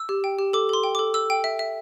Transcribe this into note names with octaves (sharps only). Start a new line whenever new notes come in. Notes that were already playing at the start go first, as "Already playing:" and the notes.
Already playing: E6
G4
G5
G4
A4 D6
A4 C6
G5
A4 D6
A4 E6
G5
E5
E5